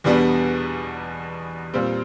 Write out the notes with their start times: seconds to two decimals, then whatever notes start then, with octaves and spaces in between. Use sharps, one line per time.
0.04 E2 B2 G3 B3 D4
1.74 A#2 G3 C4